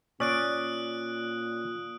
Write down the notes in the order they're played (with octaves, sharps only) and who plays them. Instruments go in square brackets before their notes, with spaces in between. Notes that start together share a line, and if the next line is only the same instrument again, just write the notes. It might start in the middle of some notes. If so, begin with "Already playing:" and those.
[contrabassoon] A#2 [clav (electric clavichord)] C#4 D5 [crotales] D#6 F#6 D7